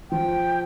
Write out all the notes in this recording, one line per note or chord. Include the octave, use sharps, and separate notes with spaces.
F3 G5